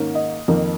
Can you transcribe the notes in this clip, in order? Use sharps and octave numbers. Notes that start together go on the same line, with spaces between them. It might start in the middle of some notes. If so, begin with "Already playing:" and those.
Already playing: G#2 D#3 A#3 C#4
D#5
F2 D#3 A#3 D#4